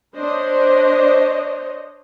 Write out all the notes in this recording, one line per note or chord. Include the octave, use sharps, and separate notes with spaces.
D4 C5 C#5 D#5